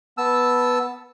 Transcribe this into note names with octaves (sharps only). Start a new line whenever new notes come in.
B3 A5 E6